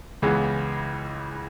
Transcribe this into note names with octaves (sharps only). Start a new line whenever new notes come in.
C#2 C#3 E3 G#3 B3